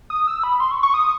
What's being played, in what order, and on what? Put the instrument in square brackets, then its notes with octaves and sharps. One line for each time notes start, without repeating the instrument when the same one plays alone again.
[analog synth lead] D#6
E6
B5
C6
C#6
C#6
D#6